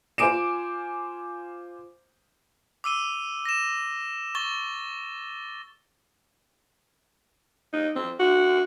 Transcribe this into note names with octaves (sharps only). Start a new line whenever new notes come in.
F4 C5 G#5 D6 D7 E7
D6 E6 D#7 G7
A#6 E7
C#6 A6 G7
D#4
C4
F#4